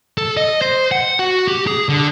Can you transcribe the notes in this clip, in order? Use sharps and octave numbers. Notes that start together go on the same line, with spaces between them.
A4
D#5
C5
F#5
F#4
G4
G#4
D3